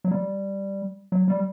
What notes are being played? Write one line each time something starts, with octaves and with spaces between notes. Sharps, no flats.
F#3
G3
F#3
G3